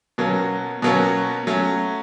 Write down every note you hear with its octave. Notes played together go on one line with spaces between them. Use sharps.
B2 F#3 A#3 C#4
B2 F#3 A#3 C#4
F#3 A3 C#4